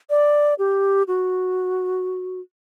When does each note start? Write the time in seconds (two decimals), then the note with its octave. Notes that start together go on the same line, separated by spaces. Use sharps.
0.10 D5
0.59 G4
1.08 F#4